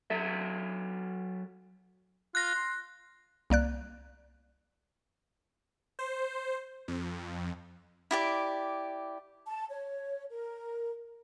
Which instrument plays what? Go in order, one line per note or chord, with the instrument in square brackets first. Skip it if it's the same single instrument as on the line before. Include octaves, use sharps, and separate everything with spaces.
[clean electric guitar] F#3 A4 E5
[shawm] F4 [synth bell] F#6 A#6
[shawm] C6
[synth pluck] C2 A#3 D5 F#6
[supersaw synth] C5
F2
[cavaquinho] E4 G4 D5
[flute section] A5
C#5
A#4